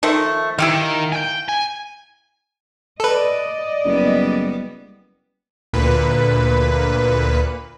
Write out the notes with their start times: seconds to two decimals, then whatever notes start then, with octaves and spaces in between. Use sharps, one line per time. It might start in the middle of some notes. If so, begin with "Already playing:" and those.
0.03 D#3 F3 A3
0.59 D#3 E4 G4 F5
1.12 G5 G#5
1.49 G#5
3.00 A4 B4 D5 D#5
3.85 F#1 G3 B3
5.73 D2 A#2 B4